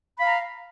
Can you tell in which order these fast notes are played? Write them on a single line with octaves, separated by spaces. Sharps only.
B5 F5 A#5